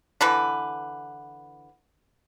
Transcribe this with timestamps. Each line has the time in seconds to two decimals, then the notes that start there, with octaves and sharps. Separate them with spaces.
0.21 D3 E3 B4